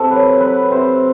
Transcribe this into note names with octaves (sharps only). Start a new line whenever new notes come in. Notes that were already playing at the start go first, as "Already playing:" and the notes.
Already playing: C3 A4
F#3 B4
F#3 B4
C3 C5